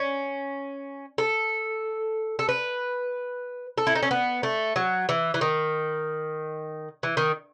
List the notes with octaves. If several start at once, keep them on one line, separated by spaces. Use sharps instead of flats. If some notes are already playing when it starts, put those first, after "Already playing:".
Already playing: C#4
A4
A4
B4
A4
E4
D#4
C#4
B3
A3
F#3
E3
E3
D#3
E3
D#3